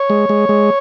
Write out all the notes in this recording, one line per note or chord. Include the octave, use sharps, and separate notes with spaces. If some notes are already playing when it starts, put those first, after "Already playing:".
Already playing: C#5
G#3
G#3
G#3